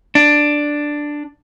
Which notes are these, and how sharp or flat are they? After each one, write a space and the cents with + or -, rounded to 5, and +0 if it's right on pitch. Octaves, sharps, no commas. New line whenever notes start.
D4 +5